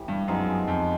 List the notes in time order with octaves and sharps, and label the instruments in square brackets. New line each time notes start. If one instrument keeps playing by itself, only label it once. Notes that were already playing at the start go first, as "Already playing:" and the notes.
Already playing: [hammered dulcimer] A2 E3 G3
[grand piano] G2
[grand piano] F#2 [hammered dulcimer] F3 G#3 B3 D#4
[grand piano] F2